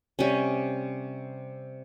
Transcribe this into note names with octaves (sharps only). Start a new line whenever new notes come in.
C3 G3 C#4